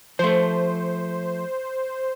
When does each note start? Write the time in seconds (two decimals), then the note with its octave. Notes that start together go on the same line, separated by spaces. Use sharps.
0.19 F3 A3 C5